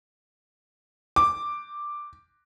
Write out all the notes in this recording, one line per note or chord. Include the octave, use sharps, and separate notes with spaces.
D6